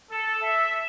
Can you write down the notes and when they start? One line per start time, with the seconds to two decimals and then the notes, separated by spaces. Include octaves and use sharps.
0.10 A4
0.42 E5